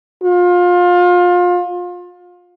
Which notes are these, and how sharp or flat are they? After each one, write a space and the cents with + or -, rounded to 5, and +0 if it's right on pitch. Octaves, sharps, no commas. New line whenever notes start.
F4 +25